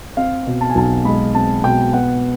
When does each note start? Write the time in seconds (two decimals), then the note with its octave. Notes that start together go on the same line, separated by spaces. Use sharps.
0.17 C4 F5
0.46 B2
0.61 A5
0.70 G#5
0.75 B1 A5
1.05 G#3 B5
1.35 C4 A5
1.63 B2 G5
1.93 B3 F#5